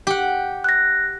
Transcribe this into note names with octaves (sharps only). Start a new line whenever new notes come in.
G4 F#5
F#6 A#6